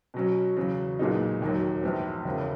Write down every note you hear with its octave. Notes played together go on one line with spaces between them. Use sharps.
B2 F#3 C#4
E2 C#3 F#3 C#4
B1 A#2 G#3 B3 D#4
E1 D#2 D#3 F#3
A#1 G#2 E3 B3
E1 E2 C#3 E3